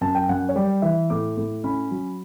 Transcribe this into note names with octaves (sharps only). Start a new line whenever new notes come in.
F#2 A5
G5
F#2 F#5
C#5
G3 D5
E3 E5
A2 D6
A2
C#4 B5
F#3